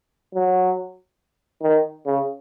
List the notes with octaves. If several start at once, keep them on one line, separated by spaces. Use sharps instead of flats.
F#3
D#3
C#3